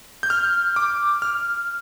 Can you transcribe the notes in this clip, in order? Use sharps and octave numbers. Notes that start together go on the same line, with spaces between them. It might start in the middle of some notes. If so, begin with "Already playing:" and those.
G6
F6
D6
F6